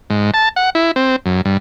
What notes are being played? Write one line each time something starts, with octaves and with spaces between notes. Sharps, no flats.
G#2
A5
F#5
E4
C4
F#2
G2